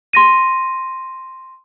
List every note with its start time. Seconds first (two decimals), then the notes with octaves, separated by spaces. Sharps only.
0.13 C6 A#6 D#7